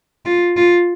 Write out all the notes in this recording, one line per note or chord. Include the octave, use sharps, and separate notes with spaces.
F4
F4